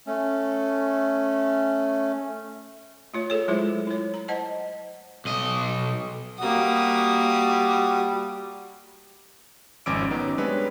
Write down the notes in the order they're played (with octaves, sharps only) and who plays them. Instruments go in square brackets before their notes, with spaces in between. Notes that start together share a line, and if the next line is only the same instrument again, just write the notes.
[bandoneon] A3 C#4
[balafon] A3 F4 C#5
G#4 A4 C#5
F#3 G#3 E4 F4 C5
E4 C#5
A#5
C5 D#5 F#5 A5
[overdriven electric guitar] B1 D#5
[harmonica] G3 [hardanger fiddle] A#3 D#6 [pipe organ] F#4
[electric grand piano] G#1 F2 C#4 D6 E6 D7
D#3 F#3 B3 C#4 D#4
G3 G#3 C4 D4 B4 C#5